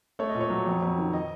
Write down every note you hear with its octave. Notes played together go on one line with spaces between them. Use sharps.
A3 C#5
D#5
A#2
C#5
F#3
F2
F2
D#3
D#5